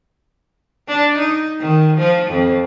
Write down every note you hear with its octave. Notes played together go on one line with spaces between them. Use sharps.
D4
D#4
D#3
F3
F2